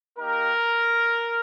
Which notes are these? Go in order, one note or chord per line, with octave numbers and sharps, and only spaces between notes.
A#3 D#4 G4 A#4